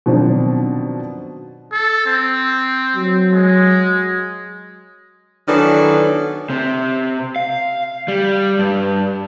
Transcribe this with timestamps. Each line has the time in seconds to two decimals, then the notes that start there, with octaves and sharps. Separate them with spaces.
0.06 B2 D#3 F3 F#3 C4 D4
1.72 A4
2.06 C4
2.96 F#3
3.32 G#3
5.48 D#3 E3 F#3 B3 D4 A4
6.50 C3
7.36 F5
8.08 G3
8.59 G2